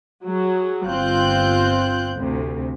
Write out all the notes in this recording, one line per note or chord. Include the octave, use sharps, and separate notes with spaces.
F#3 G#4
G1 C4 F4 F#6 G6
D2 C3